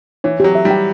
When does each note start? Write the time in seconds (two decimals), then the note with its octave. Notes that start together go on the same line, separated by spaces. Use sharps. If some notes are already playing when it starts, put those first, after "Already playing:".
0.24 E3 C#5
0.40 F#3 G4
0.55 E5
0.65 G3
0.71 G5